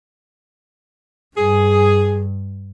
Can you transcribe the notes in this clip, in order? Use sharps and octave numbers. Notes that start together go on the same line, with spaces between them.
G2 G#4